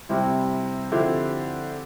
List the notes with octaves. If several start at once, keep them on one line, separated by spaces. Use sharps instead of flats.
C3 G3 C4 E4 G4
D3 F3 C4 E4 G4